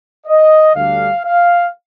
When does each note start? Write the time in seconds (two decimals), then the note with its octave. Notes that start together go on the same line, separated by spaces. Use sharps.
0.26 D#5
0.75 D2 D3 G3 D4 F5
1.24 F5